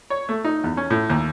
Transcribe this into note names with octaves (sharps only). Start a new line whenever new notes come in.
C#5
A3
D#4
E2
C#4
A2
D#2